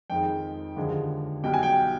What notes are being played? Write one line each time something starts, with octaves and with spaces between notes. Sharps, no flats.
F2 D#3 G#3 G5
D#2 D3 F3 G#3
B1 B2 G3 G5
G#5
G5